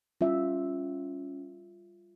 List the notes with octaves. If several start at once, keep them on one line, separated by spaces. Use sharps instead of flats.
G3 C#4 F4 E5